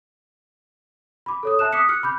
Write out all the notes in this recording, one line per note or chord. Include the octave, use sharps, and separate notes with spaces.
B5 D6
A4 C#5 D#6
E5 A5 F#6 E7
D6 D#6 F#6 B6 C#7
F6 F#6 C#7
B5 D6 G6